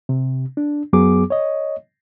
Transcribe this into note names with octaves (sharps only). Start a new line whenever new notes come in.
C3
D4
F#2 F#3 B3 G#4 D6
C#5 D#5